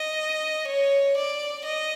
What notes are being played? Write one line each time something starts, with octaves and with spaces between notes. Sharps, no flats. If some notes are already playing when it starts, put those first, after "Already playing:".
Already playing: D#5
C#5
D5
D#5